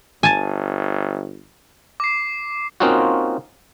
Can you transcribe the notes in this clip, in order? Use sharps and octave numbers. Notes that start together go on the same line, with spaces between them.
G1 G#5 A5
D6 C7
A#3 C4 C#4 D#4 F4 F#4